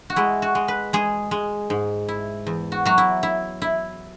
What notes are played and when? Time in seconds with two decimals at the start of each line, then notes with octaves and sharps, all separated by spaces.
0.10 F#4
0.16 G#3 E4
0.42 F#4
0.55 G#3
0.68 B4
0.93 G#3 G#4
1.31 G#3
1.70 G#2
2.08 E4
2.47 E2
2.72 F#4
2.85 F#3 F#4
2.98 E4
3.23 E4
3.62 E4